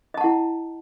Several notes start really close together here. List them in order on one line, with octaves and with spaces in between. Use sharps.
D#5 A5 F#5 E4